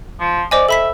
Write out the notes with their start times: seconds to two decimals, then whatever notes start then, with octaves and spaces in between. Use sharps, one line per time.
0.20 F3
0.51 C5 D5 D#5 G#5
0.69 A4 E5 B5 B6